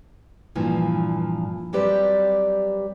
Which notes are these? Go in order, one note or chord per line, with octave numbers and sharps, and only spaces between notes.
G2 A#2 E3 F3
F#3 G3 C4 G4 B4 D5